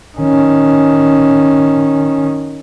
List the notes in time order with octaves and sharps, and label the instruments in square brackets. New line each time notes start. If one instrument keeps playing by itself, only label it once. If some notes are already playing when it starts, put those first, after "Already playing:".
[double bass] D#3 C#4